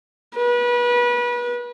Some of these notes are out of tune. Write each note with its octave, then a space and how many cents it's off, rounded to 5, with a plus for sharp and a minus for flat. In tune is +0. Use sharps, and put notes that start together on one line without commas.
B4 -30